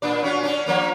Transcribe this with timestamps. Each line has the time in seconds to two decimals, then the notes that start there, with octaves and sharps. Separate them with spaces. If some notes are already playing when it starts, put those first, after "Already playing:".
0.02 A#2 D4 D5
0.23 C#4 F4 F#4
0.43 C#4 D4 D5
0.66 F3 A#3 C#4